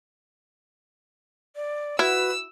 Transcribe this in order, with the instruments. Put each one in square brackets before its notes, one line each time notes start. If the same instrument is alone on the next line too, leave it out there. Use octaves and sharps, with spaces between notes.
[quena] D5
[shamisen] E4 [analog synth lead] F#4 [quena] B4 [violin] E6